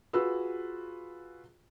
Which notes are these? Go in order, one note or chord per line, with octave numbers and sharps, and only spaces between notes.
F4 F#4 G#4 B4 E6